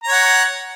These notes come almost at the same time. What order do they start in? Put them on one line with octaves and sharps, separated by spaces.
A#5 C#5 F#5